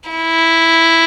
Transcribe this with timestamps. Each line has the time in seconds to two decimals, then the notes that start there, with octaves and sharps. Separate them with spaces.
0.10 E4